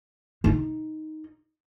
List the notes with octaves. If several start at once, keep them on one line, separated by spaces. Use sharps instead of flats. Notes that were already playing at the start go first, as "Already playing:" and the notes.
D#4